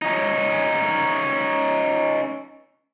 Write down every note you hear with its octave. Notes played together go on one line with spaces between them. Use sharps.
C#4 D#4